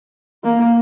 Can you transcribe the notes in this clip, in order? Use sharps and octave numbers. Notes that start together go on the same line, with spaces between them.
A#3